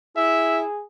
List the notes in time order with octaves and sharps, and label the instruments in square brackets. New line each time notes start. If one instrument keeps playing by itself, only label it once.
[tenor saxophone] E4 [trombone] G#4 [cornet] E5